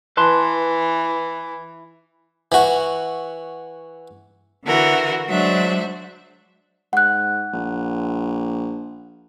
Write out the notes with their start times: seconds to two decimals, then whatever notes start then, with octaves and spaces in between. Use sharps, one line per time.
0.17 E3 B4 A5 C6
2.52 E3 F#4
4.64 D3 E3 F#4 A#4
5.28 F#3 G#3 D4 C5 E5
6.93 G#2 F#5 F#6
7.53 A#1